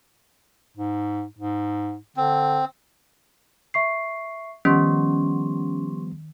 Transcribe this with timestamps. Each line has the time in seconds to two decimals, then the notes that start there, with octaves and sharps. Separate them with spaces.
0.77 G#2
1.39 G#2
2.17 D3 C4
3.74 E5 C#6 C7
4.65 D#3 F3 G3 B3 C#4 G4 C6 C#6